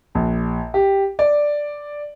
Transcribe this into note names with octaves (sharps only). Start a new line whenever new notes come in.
A#1
G4
D5